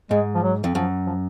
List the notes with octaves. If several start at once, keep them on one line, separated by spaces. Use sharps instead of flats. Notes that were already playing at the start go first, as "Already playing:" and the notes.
G#2 G#3
F3
F#3
F2
F#2 F3
F3